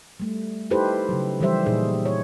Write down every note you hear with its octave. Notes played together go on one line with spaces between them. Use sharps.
G3 A3
D#4 E4 G4 A4 B4 C5
C#3 F#3
E3 F3 G3 G4 C5 E5
A#2 D#4 G#4
C#5